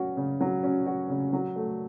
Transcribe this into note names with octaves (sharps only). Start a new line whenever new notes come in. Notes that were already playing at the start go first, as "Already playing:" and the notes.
Already playing: F#3 C#4 F#4
C#3
F#3
C#4
F#4
C#3
F#3
A3